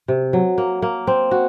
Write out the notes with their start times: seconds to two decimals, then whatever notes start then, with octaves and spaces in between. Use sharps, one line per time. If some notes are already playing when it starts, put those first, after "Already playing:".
0.08 C3
0.33 F#3
0.58 A#3
0.82 A#3
1.07 C4
1.31 F#4